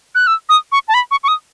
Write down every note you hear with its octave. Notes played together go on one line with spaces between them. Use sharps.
F#6
E6
D#6
C#6
A5
B5
C#6
C#6
D#6